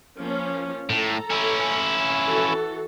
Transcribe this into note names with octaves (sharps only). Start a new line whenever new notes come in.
F3 A#3 C#4
A2 A4 A#5
C#4 E4
E3 F#4 A4